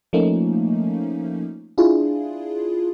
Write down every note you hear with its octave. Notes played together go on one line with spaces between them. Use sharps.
F3 A3 A#3 C#4 D#4
D4 E4 F4 G#4